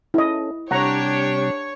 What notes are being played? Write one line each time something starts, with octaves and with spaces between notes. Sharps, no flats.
C#4 E4 A4 D#5
C3 G3 D4 G4 C#5 F#5 A#5